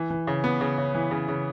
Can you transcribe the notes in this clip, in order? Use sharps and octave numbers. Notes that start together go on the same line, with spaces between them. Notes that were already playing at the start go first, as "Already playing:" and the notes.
Already playing: E3
E3
C#3
B3
C#3
C#3
E3
C#3
C#3